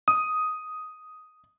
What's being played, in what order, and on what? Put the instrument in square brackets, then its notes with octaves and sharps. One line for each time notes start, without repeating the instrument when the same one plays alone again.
[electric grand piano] D#6